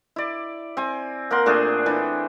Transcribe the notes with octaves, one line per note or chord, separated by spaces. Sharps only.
E4 D5
C4 G#5
A#3 A#4 F#5 C6
A#2 A3 D4 G#4
E3 D4